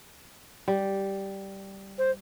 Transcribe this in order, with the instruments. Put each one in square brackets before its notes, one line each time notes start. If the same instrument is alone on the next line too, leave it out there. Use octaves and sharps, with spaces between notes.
[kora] G3
[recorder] C5